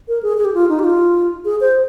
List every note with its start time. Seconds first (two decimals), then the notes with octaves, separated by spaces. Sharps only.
0.08 A#4
0.23 G#4
0.37 G#4
0.45 G4
0.54 F4
0.69 D#4
0.79 G4
0.84 F4
1.45 G#4
1.61 C5